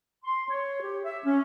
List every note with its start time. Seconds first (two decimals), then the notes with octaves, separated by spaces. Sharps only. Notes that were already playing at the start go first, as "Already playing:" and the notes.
0.24 C6
0.49 C#5
0.82 G4
1.04 E5
1.25 C#4